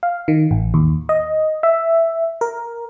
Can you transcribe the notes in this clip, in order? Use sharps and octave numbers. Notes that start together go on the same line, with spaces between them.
F5
D#3
A1
D#2
D#5
E5
A#4